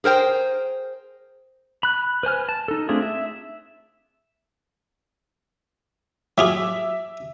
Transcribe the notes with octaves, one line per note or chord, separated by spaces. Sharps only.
G#4 A#4 C5 G5
B5 F#6
B4 C5 G#5 F6
A5
D#4 A4
A3 C4 D4 F4 G#4
E5
F#3 F4 G#4 E5 D6